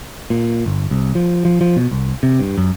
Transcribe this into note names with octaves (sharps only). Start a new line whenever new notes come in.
A#2
G1
C2
F3
F3
F3
B2
C2
C3
G2
F#2